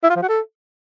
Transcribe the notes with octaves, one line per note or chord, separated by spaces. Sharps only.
E4
F4
F3
F#4
A4